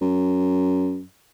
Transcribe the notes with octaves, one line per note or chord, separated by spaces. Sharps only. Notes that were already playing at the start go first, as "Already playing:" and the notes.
F#2